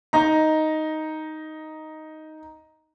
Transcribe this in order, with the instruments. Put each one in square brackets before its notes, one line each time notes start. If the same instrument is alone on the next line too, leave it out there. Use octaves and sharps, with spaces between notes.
[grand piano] D#4 A#5